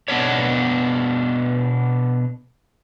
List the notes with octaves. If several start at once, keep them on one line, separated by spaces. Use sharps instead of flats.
B2 B3 D4 C#5